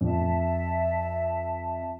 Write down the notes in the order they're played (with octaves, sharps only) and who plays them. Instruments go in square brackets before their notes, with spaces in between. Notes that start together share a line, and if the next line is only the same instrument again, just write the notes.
[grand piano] F2 [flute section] E5 A5